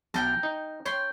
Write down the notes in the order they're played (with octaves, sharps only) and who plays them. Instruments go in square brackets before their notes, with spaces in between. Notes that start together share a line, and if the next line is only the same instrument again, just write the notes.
[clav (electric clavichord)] B1 A5 [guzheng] A#4 G5 A#5
[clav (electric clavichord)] D#4
[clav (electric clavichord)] C#5 [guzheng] G5 C6